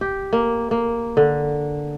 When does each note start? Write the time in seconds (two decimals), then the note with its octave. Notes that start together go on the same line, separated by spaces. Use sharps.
0.01 G4
0.33 A#3
0.71 A#3
1.17 D3